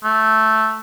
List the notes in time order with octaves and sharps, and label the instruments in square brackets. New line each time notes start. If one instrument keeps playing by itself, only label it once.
[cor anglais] A3